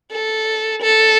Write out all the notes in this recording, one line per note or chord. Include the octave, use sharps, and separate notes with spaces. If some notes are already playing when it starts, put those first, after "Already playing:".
A4
A4